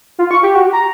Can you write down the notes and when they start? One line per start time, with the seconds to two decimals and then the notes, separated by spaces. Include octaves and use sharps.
0.19 F4
0.31 C#6
0.43 G4
0.55 F#4
0.73 A#5